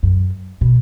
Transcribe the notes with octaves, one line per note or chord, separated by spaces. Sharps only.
F#2
B2